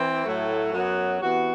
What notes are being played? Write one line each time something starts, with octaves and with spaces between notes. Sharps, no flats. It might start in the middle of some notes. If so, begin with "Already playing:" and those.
Already playing: E3 C4
A2 F#3 A3
F#2 F#3 B3
C3 E3 B3 F#4